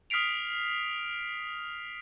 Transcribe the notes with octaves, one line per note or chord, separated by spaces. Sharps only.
D#6 F6 B6 C7 D7 F7